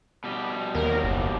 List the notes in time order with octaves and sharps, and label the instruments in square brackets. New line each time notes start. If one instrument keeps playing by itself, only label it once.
[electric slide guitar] B2 G3
[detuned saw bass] D#2 [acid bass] A#4
[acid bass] F#1